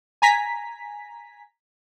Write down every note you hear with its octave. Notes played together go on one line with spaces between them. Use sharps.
G#5 A#5 B6